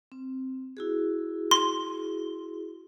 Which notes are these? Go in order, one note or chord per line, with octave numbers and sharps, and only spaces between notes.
C4
E4 F#4 G#4
C6